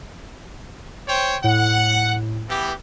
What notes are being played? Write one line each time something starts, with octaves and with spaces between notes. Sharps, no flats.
C5 C#5 G5
A2 F#5
E3 B3 G4